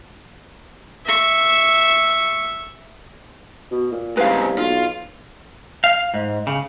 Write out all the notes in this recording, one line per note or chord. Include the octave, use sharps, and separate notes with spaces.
E5 C#6
B2
A#2
C2 G#2 C#3 B4 F5
B1 F4
F5
G#2
C#3